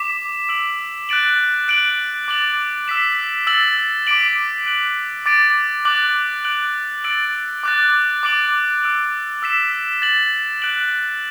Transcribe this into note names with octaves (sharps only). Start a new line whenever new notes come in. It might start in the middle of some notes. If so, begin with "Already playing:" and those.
Already playing: D6 B6 E7
E6 D7 F#7
F#6 A6 D7 F#7
F#6 D7 F#7
D6 A6 F#7
E6 B6 E7
E6 A6 F#7
D6 B6 D7 F#7
F#6 D7 F#7
D6 A6 D7
D6 F#6 A6 F#7
F#6 D7 F#7
E6 A6 D7 F#7
D6 F#6 A6
D6 A6 D7 F#7
E6 D7 F#7
E6 B6 E7
A6 F#7
F#6 D7 F#7